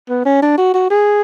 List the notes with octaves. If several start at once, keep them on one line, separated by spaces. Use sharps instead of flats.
B3
C#4
D4
F#4
F#4
G#4